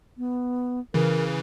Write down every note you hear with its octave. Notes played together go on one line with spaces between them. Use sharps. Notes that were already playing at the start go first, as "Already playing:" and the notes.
B3
C#3 E3 A#4